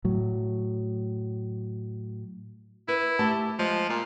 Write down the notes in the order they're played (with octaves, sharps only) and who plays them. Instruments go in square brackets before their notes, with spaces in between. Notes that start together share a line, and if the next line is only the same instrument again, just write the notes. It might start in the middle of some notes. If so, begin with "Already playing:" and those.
[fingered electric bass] A2 F#3
[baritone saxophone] E4 [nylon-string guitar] B4
[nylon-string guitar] A3 G4 A5
[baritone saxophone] F3 [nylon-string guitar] G#3
[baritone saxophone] A#2